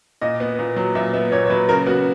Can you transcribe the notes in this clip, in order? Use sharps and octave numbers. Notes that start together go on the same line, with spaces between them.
A#2 D#5
B3
A#2
F#3
A#2 E5
B3 E5
A#2 C#5
C#5
F#3 B4
C#3 A#4
B3 F#4